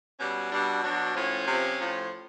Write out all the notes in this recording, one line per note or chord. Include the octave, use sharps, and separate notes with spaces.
B2 G3 C#4
B2 G3 D4
B2 F#3 D4
A2 F3 C#4
C3 F3
A2 F3